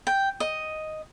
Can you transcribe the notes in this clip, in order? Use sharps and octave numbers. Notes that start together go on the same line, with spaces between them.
G5
D#5